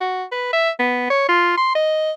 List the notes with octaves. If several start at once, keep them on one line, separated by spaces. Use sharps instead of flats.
F#4
B4
E5
B3
C#5
F4
C6
D#5